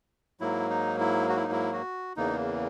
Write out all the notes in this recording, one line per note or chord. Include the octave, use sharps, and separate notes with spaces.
G#2 F#3 A#3 E4
D#4
E4
F#4
E4
D#4
E4
F#4
E2 C#3 E3 A#3 D#4